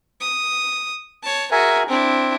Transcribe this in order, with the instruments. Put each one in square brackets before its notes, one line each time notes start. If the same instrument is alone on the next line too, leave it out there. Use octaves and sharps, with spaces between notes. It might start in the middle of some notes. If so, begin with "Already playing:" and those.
[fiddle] D#6
C#5 A5
[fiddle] F#4 G#4 [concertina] A#4 E5 G#5
[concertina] C4 [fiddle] D4 E4